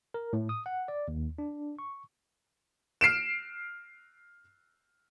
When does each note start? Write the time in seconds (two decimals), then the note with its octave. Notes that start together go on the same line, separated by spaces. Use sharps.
0.14 A#4
0.33 A2
0.49 D#6
0.66 F#5
0.88 D5
1.08 D#2
1.38 D4
1.79 C#6
3.01 F6 C7 D7 E7